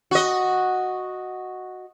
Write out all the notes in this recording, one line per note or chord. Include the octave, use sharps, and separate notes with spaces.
F#4 D#5